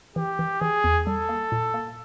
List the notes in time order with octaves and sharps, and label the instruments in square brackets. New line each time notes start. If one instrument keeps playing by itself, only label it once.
[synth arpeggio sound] E3 [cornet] G4
[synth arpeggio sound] E3
[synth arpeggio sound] E3 [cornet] G#4
[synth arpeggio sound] E2
[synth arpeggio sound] G3 [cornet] A4
[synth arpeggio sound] A#3
A#2
A#3